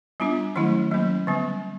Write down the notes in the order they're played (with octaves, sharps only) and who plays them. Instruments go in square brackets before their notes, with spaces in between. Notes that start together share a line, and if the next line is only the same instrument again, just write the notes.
[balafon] G3 B3 D4 F4
D#3 F#3 A3 C#4 E4
F#3 A#3 C#4
D3 G3 B3